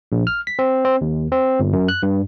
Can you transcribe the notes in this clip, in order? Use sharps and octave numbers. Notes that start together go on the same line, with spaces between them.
A#1
F6
B6
C4
C4
D#2
C4
G1
F#2
F#6
G2